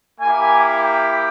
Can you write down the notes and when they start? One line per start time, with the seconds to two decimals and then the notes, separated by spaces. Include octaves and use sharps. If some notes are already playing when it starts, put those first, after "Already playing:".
0.21 A#3 E4 G4 G#5
0.81 G5